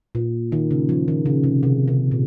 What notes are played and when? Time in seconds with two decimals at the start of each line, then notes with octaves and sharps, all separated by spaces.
0.15 A#2
0.52 D#3
0.71 C#3
0.89 F3
1.08 D#3
1.26 C#3
1.44 C3
1.63 C3
1.88 C3
2.11 A#2